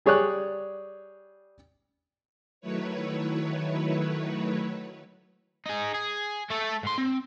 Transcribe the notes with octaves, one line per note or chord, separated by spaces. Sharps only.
G3 G#4 C#5 D5 F#6
D#3 F#3 A3 E4 B4 C#5
D#4 G#4
G#4
A3 A4
G#2 C6
C4